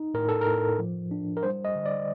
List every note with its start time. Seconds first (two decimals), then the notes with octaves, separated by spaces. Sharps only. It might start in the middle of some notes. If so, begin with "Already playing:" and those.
Already playing: D#4
0.14 A2 A#4
0.29 A4
0.41 A#4
0.46 A2
0.79 F3
1.11 D4
1.37 A#4
1.43 G3 C5
1.65 D#5
1.75 D3
1.86 D5